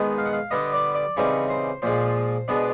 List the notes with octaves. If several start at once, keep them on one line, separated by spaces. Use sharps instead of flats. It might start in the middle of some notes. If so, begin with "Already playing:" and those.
Already playing: D#3 G#3 B3 D#4
F5
F#5
F5
D3 G3 B3 D#5
D5
D5
C#3 E3 G3 C4 D#4 C#5
C5
A#2 F3 G#3 C5
B2 G#3 B3 D4